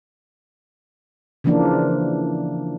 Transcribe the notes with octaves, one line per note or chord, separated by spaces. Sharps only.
C#3 E3 F3 A#3 D4